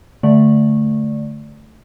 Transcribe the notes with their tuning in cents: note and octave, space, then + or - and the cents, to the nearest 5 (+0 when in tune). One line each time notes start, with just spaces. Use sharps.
D3 +0 A3 +0 D5 +0